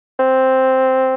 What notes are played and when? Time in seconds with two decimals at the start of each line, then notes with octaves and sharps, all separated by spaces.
0.19 C4